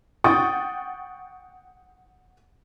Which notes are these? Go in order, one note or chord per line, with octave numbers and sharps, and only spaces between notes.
F#5 G5 C#6 D#6 A6